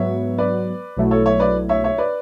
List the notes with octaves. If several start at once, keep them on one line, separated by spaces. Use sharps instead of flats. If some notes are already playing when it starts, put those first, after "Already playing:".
Already playing: G#2 F#3 B3 C#5 E5
B4 D5
B1 B2 F#3 A3 E4
A4 C#5
C#5 E5
B4 D5
C#5 E5
C#5 E5
B4 D5